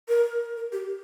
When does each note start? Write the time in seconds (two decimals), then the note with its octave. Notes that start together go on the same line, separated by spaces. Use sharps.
0.09 A#4
0.57 A#4
0.72 G4